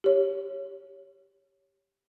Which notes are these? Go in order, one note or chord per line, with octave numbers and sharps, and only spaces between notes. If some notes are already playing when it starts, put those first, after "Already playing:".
G4 C#5